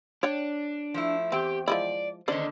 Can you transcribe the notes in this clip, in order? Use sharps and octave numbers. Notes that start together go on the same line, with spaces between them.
D4 C#5 D5 G5
F3 A3 E4
E2 C4 G4 G5
F3 G#3 E4 D5
D3 D#3 A#3 C#4 D4 C5 D5 D#5